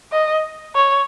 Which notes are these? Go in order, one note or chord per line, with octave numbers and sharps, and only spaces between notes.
D#5
C#5